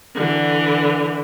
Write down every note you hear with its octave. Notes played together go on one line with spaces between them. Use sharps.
D3 E3